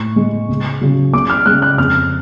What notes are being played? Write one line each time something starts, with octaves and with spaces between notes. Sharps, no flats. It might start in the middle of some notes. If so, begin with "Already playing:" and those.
Already playing: A2 C#6
G#3
C#2
C#3 F#3
C#2 D6
F6
C#3 G#3 F#6
F#6
F2 F6